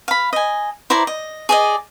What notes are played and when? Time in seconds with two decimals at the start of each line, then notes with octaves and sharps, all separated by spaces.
0.08 F5 B5
0.33 D#5 G#5
0.90 E4 C5 D5 A#5
1.07 D#5
1.49 G#4 D5 D#5